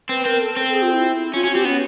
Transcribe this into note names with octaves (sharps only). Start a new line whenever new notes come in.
C4 B4
C4 A#4
A4
C4
G#4
F4
E4
C#4 F4
C#4 F#4
C4 G4
B3 C#4